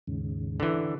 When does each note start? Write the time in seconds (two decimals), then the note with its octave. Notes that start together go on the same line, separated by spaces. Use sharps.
0.07 D#2 G#2 C#3
0.60 D3 E3